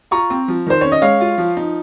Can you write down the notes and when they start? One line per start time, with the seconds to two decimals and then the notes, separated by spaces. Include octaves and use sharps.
0.11 F4 A#5 C#6
0.30 C4
0.48 F3
0.67 D#3 C5
0.81 C#4 C#5
0.92 D#5
1.02 G#3 C#5 F5
1.21 F4
1.38 F3
1.57 D#4